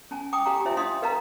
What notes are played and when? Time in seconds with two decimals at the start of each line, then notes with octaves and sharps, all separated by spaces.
0.11 C#4 G#5 A5
0.33 G5 G#5 D6 D#6
0.46 G4 F5 G#5 A#5
0.65 E4 F4 C5 E5 G#5
0.77 D4 D#5 F5 G5 C6 D#6
1.02 A#4 B4 D#5 F5 A5 A#5